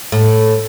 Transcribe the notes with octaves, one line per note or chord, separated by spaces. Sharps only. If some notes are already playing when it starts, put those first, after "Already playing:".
A2